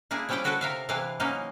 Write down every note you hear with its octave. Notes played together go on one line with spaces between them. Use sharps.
A#3 D4 E4 G#4
F3 G3 C#4 E4 D5 G5
D4 F#4 A4 B4 A5
C3 A#4 E5 F5
C3 E3 D4 E4 B4 F5
E3 F#3 A#3 C#4 D#4